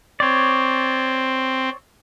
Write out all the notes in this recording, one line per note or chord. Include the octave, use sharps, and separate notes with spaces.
C4 C#5 D5